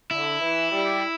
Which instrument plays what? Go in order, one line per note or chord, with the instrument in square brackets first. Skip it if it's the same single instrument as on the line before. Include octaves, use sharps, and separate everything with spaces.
[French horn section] D3 [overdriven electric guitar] E4
[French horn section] E3
G3